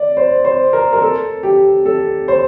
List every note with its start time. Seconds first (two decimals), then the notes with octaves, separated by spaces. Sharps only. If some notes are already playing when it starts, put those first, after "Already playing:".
Already playing: D5
0.17 C5
0.45 C5
0.73 A#4
0.93 A#4
1.02 A4
1.43 G4
1.86 A4
2.28 C5